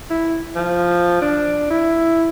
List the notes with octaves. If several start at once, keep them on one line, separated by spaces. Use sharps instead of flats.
E4
F3
D4
E4